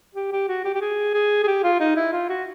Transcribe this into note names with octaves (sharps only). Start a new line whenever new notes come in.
G4
G4
F#4
G4
G4
G#4
G#4
G#4
G4
F4
D#4
E4
F4
F#4